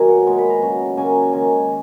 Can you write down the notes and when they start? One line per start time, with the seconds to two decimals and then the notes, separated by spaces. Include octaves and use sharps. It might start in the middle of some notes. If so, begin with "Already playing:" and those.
Already playing: B2 D#3 F#3 A#3 G#5
0.09 F#5
0.27 A#2 G#3 B3 G#5
0.38 B5
0.50 A#5
0.62 C#3 F#3 C#4
0.97 C#3 F#3 A#3 C#4 G#5
1.33 D#3 G#3 D#4 G#5